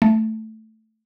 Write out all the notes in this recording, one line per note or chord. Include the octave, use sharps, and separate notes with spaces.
A3